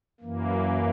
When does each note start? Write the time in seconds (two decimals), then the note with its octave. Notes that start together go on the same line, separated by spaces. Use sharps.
0.20 F#2 E3 A#3